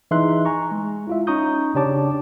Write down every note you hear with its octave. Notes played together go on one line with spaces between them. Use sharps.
E3 D#4 G#4 E5 C6 F#6
G#5 A#5 C#6
G#3
E4 F4 E5
C#4 D#4 A#5 C#6 D#6 G6
C#3 D4 G4 C#5 A5 D6